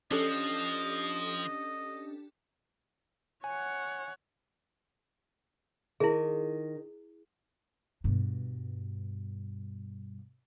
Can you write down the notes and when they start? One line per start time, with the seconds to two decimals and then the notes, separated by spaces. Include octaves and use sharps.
0.11 F3 C#4 D4 G4 A4 D#5
3.44 C#5 F#5 G#5
6.00 D#3 E4 G#4
8.04 G2 B2